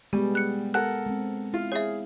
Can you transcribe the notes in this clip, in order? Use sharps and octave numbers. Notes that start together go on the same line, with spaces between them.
G3 G#3 B3 G4 G#4
F#6 C#7
A4 A#4 F#5 F#6
G#3 C4
E4 F4 F5
G#4 C#5 E5